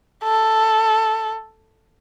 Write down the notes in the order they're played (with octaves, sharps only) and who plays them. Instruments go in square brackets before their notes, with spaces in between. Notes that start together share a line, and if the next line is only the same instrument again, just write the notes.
[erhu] A4